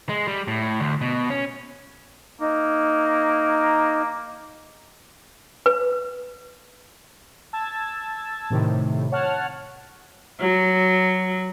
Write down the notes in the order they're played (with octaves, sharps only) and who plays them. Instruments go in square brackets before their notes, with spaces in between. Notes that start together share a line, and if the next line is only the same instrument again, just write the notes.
[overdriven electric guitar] G#3
G3
A2
D2
B2
C#4
[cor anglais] A#3 [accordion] D#4
[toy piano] B4
[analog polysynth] A5 E6 G#6 A6
A2 C3 D#3
C#5 F#5 A5 F6
[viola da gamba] F#3